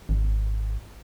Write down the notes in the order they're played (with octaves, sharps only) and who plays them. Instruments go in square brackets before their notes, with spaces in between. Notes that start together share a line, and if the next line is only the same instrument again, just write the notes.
[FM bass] G#1